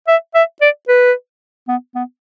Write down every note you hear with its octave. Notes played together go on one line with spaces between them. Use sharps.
E5
E5
D5
B4
B3
B3